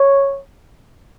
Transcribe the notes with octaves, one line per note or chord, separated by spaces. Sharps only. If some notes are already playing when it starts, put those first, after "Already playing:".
Already playing: C#5